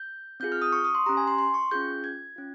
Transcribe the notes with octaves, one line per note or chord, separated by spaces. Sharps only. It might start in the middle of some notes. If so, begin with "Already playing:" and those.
Already playing: G6
C4 F4 G#4 G6
F6
D#6
C#6
D#6
C6
C#4 G4 A#5
G#5
C6
C6
C#6
C#4 F4 G#4 G6
G#6
C#4 F4